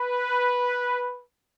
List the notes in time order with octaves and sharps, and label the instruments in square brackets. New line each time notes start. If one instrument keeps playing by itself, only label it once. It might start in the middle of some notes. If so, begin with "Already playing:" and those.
Already playing: [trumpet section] B4